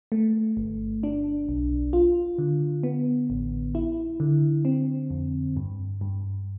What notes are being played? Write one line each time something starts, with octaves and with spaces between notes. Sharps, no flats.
A3
G1
D4
B1
F4
D3
B3
A1
E4
D3
C4
F2
G2
G2